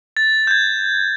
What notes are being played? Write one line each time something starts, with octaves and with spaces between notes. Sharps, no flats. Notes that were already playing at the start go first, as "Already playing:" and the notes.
A6
G6 G#6